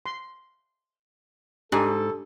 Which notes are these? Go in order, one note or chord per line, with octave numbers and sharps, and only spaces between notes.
C6
G#2 D4 G4 A4 G#5